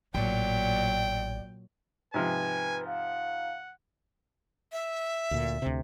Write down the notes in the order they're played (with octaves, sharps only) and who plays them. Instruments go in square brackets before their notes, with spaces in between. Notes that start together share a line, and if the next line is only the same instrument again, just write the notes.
[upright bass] A1 [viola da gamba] A#2 F#3 [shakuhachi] D5 [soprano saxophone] G5
[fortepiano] G#2 C3 F3 [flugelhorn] B4 [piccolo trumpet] G#5
[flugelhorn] F5 [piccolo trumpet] F#5
[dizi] E5
[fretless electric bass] D2 A#2
D2 C3